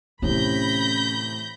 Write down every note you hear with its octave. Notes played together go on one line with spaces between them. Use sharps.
A2 C3 E3 C#4 B5 G6 A#6